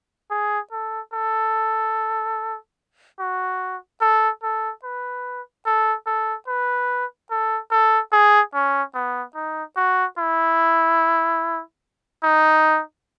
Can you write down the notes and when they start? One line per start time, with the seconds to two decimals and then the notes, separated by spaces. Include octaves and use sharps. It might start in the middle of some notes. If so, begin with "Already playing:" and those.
0.31 G#4
0.72 A4
1.14 A4
3.19 F#4
4.01 A4
4.43 A4
4.84 B4
5.66 A4
6.06 A4
6.48 B4
7.31 A4
7.71 A4
8.12 G#4
8.54 C#4
8.95 B3
9.35 D#4
9.77 F#4
10.18 E4
12.24 D#4